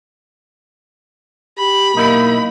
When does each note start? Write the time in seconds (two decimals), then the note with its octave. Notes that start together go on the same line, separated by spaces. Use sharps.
1.58 G4 B5
1.95 B1 A#3 D#4 E4